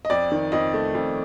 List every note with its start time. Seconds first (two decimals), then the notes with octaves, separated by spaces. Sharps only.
0.05 D#5
0.10 F2 D5
0.32 D#3
0.52 F2 D#5
0.74 A3
0.95 F2